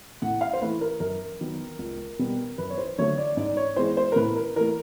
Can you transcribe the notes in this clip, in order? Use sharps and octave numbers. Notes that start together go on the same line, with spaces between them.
A2 F#5
F5
C5
E3 A3 B4
A#4
F#2 A#4
D#3 F#3 B3
C#2
B2 G3 B3
F#2 B4
C#5
C5
D3 F#3 A3 C#5
D5
G#2 D5
C#5
E3 G#3 B3 C5
C5
A#4
A2 B4
A#4
E3 A3 A#4